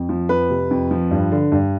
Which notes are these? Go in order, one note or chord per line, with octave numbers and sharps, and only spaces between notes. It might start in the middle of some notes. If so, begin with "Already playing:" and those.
Already playing: F2
F3
F2 B4
C3
F2
F3
G2
D3
G2